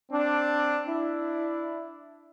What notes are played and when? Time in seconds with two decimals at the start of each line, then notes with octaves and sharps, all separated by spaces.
0.11 C4 D4
0.88 D4 E4